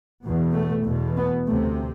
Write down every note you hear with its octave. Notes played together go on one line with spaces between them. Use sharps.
E2 B2
A3
E2 B2
B3
D2 C3 A3